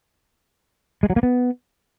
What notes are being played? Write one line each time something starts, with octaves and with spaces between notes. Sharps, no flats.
G#3
F#3
A#3
B3